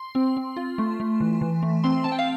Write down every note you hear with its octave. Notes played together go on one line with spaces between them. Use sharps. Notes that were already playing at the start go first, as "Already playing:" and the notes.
Already playing: C6
C4
C4
F4
A3
A3
E3
E3
A3
C4 C6
C4 A5
G5
F5